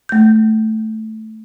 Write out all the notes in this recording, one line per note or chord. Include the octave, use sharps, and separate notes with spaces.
A3 G6